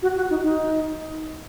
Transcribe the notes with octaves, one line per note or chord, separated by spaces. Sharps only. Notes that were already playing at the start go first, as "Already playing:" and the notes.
F#4
F#4
D#4
D#4